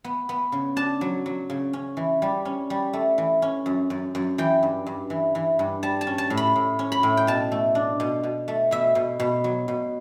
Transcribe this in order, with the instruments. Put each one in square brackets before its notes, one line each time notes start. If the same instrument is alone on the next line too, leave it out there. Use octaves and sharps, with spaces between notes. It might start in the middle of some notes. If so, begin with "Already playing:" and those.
[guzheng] B3
B3
C#3
D4 A5
F#3
F#3
C#3
C#4
E3
G3
C#4
G3
A3
E3
C#4
F#2
F#2
F#2
E3 G5
G2
G2
E3
E3
G2
G3 A5
A5
C#4
A5
A2
B5
A2
C#4
B5
A2
G5
B2 A5
A3
D4
B2
B2
A3
B2 E5
B2
B2
F#3
B2